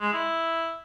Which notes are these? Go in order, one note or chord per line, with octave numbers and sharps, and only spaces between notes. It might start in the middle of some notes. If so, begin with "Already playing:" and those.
G#3
E4